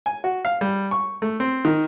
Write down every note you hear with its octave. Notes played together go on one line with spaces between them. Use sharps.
G#5
F#4
F5
G3
C#6
A3
C4
D#3